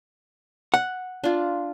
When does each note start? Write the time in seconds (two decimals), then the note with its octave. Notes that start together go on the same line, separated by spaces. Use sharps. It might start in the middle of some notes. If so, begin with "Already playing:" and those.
0.74 F#5
1.24 D4 F4